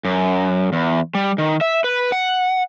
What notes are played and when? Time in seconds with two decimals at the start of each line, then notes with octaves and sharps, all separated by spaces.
0.05 F#2
0.73 E2
1.15 G3
1.38 D#3
1.61 E5
1.84 B4
2.12 F#5